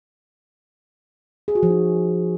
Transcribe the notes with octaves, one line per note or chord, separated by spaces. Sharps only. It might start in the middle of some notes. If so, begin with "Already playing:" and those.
G#4
F#4
F3
D#4